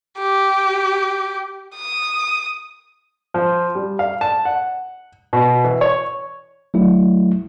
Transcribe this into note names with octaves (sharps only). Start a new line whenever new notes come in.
G4
D#6
F3
G3
F5
A5
F#5
B2
E3
C#5
F#3 A3 E4